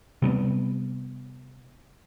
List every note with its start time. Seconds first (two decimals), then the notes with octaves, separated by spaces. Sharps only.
0.22 C3 G3 A3 B3